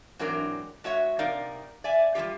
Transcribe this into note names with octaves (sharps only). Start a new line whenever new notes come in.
G#2 E3 F#3 C4 D4 A#4
G#3 F#4 C#5 E5
C3 D#4 A#4 D5 F5
D5 E5 G#5
G3 G#3 F4 G4